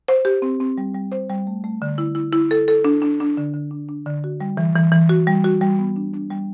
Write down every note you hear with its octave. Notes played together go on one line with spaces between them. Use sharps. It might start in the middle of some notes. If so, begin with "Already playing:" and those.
C5
G4
C4
C4
G3
G3
C5
G3
A3
A3
D3
E4
E4
E4
A4
A4
D4
D4
D4
D3
D3
D4
D4
D3
F#4
G3
E3
E3
E3
F#4
G3
F#4
G3
B3
D4
D4
G3